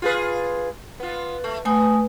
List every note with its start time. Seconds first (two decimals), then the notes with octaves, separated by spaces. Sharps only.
0.02 F4 G#4 B4
1.00 B3 F4
1.44 A3
1.65 A3 B3 G#5 D#6